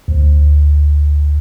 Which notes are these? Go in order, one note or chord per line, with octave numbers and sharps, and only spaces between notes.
D2